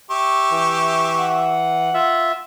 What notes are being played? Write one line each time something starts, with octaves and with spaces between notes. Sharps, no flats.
G4 E5 C#6
E3
F#5
F4 E5